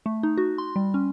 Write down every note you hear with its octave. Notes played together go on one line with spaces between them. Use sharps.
A3
D#4
F#4
C6
G3
C#4